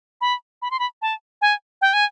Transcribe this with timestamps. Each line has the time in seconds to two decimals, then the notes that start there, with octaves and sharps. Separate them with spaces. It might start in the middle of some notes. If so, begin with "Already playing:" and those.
0.21 B5
0.62 B5
0.71 C6
0.79 B5
1.02 A5
1.41 G#5
1.81 G5
1.93 G#5